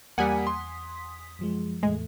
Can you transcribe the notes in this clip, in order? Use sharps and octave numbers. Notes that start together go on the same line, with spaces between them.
E2 G3 A#3 F#5 G#5 D#6 B6
C6
F#2 F3 G#3
E2 A2 G#3 A3